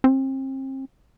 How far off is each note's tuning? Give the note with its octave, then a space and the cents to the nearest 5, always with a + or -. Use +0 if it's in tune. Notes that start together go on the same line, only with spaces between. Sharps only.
C4 +35